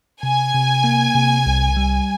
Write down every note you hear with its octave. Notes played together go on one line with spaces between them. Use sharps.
C3 G#5
C3
A#3
C3
C2
G3